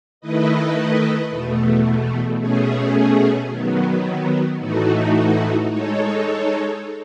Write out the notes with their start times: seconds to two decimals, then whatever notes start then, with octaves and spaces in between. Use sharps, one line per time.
0.21 D#3 A3 E4 B4 D#5
1.30 E2 B2 A3
2.39 B2 A3 C#4 G#4
3.49 D#3 F#3 B3
4.59 A2 E3 A3 D#4 F#4
5.68 G#3 D#4 A4 C#5